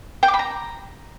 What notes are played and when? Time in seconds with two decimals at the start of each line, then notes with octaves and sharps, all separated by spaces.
0.23 G5
0.28 D6
0.34 B5
0.39 A#5